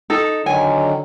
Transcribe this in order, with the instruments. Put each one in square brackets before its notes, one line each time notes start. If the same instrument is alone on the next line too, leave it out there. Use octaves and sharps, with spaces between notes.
[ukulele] D#4 A4
[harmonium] D3 D#3 F#3 [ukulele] G#5